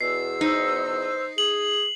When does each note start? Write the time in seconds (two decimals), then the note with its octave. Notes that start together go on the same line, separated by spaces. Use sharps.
0.01 E2 B2 E6 C7
0.41 D#4 C5
1.38 G#4 F#7